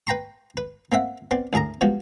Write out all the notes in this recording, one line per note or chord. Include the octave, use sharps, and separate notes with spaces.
B4 G5 A#5 C6 C#6
B4
A#3 C4 E5 F#5
B3 C4 D5
D2 A2 G#4 A#4 A#5
F3 G3 G#3 B3 F#4